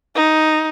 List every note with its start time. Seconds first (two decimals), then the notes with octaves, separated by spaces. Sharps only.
0.15 D#4